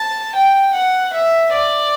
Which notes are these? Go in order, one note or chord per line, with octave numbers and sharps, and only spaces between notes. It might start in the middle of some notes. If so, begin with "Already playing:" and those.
Already playing: A5
G5
F#5
E5
D5